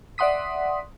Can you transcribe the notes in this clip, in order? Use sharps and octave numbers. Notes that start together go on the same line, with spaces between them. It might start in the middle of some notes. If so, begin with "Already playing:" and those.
D5 E5 F#5 C6 D#6 B6